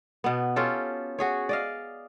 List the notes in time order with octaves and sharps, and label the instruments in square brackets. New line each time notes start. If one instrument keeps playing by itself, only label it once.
[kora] B2 B3
C#4 F4 G4 A4
F#4 G#4 C#5
D5 D#5 F5